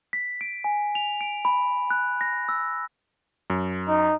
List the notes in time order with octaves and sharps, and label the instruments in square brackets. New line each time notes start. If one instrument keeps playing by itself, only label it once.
[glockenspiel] B6
D7
G#5
F7
D7
B5
F#6
A#6
E6
[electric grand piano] F#2
[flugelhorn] D#4